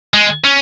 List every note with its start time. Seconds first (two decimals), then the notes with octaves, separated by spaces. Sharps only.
0.14 G#3
0.44 C#4